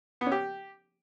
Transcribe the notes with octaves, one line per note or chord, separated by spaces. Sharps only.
B3
C#4
G4